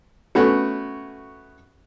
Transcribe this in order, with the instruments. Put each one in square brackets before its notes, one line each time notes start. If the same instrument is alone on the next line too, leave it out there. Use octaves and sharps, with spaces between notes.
[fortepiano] A3 B3 C#4 F#4